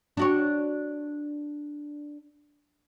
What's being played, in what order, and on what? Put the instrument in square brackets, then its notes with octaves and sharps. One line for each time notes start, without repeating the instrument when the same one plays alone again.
[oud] D4 F#4 C#5